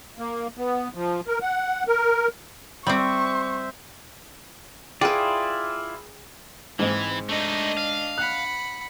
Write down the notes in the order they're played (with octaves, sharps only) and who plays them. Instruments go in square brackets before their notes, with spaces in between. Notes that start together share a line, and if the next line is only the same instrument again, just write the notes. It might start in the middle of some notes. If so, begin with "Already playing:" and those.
[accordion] A#3
B3
F3
A#4
F#5
A#4
[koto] G3 C4 [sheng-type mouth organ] C5 E5 [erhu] C#6
[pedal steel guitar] E4 F4 D5 [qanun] G#4 B4 [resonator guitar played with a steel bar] G5
[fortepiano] G#2 G#3 [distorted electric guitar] E3 [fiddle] C4
[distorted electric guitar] A3 D#4 [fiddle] D4 D#5
[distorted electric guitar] F5
[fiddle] F#5 B5 [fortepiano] F#6